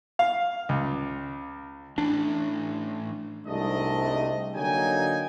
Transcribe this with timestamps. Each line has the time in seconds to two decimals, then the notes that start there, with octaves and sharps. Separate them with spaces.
0.19 F5
0.69 C#2
1.98 E3 A3 C#4 D4
3.46 C2 G#2 C3 A3 D4 D#5
4.55 D3 F#3 A#3 D#4 G5 G#5